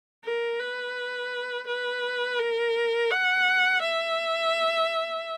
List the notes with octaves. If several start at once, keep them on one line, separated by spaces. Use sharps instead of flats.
A#4
B4
B4
A#4
F#5
E5